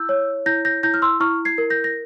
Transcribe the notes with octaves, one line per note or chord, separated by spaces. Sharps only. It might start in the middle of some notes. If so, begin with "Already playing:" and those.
Already playing: E4 E6 G6
C#5
E4 G6 A#6
G6 A#6
E4 G6 A#6
F6
C6 E6
E4 C#6 F6
G#6 C7
A#4
G6 A#6
A#6